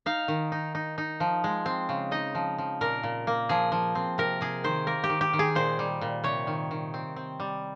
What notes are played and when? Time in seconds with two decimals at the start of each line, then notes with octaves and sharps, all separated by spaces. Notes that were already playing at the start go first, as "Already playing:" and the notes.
0.06 D#4 F5
0.28 D#3
0.52 D#4
0.75 D#4
0.98 D#4
1.20 F3
1.44 G#3
1.66 C4
1.89 C#3
2.11 D#4 D#5
2.35 F3
2.58 F3
2.81 A#2 A#4
3.03 A#2
3.27 A#3
3.49 F3 G#4
3.72 F3
3.95 C4
4.18 C3 A#4
4.41 C3 G#4
4.64 D#3 C5
4.87 A#3 A#4
5.04 G4
5.10 D#3
5.21 G4
5.33 D#3
5.39 G#4
5.55 A#2 C5
5.79 G3
6.01 A#2
6.23 C3 C#5
6.47 D#3
6.71 D#3
6.94 C4
7.16 C4
7.40 G3